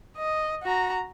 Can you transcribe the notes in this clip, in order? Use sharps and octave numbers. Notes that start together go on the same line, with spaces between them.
D#5
F#4 A#5